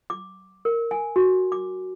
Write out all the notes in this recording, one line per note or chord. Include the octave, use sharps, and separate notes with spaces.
D6
A#4
G#5
F#4
D6